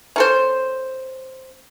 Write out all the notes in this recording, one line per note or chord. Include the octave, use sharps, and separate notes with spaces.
C#4 A4 C5